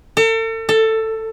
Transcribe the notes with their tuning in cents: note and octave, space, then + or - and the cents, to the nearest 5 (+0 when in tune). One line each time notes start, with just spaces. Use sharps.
A4 +40
A4 +15